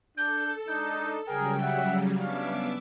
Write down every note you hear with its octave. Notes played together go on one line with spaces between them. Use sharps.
D4 A4 G6
G#3 D4 D#4 G6
C#3 F#3 G3 G#4 A#4 G5
E5 F#5
B3 C#4 D4 E5 F5 D6